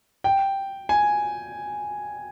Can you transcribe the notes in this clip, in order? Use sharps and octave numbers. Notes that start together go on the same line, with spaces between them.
G5
G#5